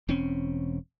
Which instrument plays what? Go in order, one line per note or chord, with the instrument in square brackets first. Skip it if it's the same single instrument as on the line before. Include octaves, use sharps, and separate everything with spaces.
[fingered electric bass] E1 C4 C#4